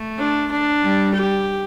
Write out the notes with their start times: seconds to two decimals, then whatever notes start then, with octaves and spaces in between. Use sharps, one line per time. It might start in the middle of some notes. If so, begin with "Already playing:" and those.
Already playing: A3
0.19 D4
0.51 D4
0.83 G3
1.14 G4